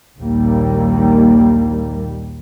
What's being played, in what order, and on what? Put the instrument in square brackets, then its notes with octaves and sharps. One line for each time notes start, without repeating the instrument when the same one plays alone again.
[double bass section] A#1 D#2 G3 A#3